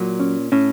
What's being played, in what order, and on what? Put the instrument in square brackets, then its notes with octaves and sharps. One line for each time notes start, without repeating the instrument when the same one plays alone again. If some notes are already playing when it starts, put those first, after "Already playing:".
Already playing: [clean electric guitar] A#2 [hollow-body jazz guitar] F#3
[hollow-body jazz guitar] C#4
[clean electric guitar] A2 [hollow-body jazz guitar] C#4